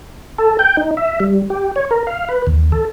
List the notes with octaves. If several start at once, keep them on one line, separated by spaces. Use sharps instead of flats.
A4
G5
D#4
E5
G3
G4
C#5
A#4
F5
B4
D#2
A4